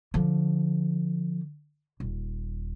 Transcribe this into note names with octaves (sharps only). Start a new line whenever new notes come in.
D3 F3
D#1